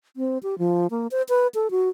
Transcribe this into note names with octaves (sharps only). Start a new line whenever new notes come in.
C4
G4
F3
A#3
C5
B4
A4
F#4